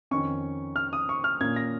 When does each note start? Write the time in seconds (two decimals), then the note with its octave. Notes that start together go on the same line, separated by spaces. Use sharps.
0.11 F2 D#3 C#4 C#6
0.76 F6
0.93 D#6
1.09 C#6
1.24 F6
1.41 A#2 A#3 C#4 G#6
1.56 A#6